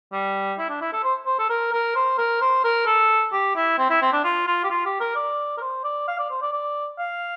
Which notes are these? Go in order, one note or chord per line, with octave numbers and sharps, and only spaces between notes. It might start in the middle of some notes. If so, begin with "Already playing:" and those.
G3
E4
D4
E4
A4
C5
C5
A4
A#4
A#4
C5
A#4
C5
A#4
A4
G4
E4
C4
E4
C4
D4
F4
F4
G4
F4
G4
A#4
D5
A#4
C5
D5
F5
D5
C5
D5
D5
F5